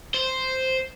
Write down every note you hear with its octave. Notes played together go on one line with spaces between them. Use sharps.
C5